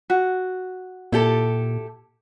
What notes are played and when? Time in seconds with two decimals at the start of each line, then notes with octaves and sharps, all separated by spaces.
0.10 F#4
1.13 A#2 E4 G4 A4